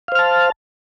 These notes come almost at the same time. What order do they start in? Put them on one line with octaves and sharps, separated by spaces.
F5 C5 F6 A5